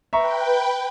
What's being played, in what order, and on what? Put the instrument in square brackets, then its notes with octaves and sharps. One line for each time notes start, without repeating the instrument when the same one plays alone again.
[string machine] B4 G5 [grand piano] E5 A#5 C#6